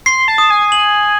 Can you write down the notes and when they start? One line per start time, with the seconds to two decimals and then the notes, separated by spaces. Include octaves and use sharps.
0.06 C6 C7
0.28 A5
0.38 D#6
0.50 G#5
0.72 F#7